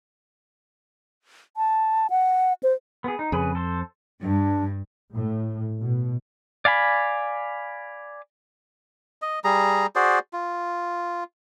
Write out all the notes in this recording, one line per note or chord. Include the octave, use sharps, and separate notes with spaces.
A5
F#5
C5
B3 G#4
D#4
F2 C#3 G#4 B4
A4 C5
G2 D4
A2
B2
D5 F5 G#5 B5
D#5
G3 G#4 A#5
F#4 G#4 C5 D5
F4